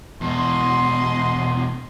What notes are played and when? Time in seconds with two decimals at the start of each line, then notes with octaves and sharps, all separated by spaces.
0.21 E2 B2 F#4 D#5 C6